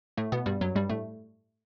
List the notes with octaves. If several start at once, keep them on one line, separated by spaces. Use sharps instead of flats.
A2 A3
B2 B3
G2 G3
F#2 F#3
G2 G3
A2 A3